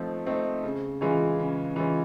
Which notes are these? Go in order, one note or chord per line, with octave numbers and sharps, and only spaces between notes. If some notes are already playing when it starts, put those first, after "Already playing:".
Already playing: F3 A3 C4 D#4
A3 C4 D#4
C#3
E3 G#3 C#4 F4
C#3
E3 G#3 C#4 F4